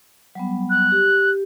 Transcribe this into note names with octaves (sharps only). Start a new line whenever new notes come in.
F#3 G3 B3
F#6
G4